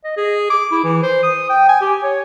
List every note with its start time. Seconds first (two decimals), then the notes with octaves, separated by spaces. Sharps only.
0.04 D#5
0.17 G#4
0.50 D6
0.71 E4
0.84 E3
1.02 C5
1.23 D#6
1.49 G5
1.69 G#5
1.81 G4
2.03 C#5